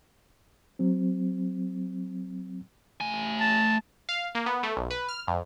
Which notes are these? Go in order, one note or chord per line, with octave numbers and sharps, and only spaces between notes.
F#3 C4
A3 G#5
A5
F5
A#3
B3
A3
B1
B4
F6
F2